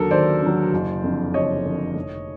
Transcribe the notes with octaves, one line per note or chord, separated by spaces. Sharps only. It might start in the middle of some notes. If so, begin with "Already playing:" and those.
Already playing: D#2 D3 F#3 A4 A#4
D#2 C5 D5
D3 F#3
F#1
F2 D3
F#1 C#5 D#5
F2 D3
F1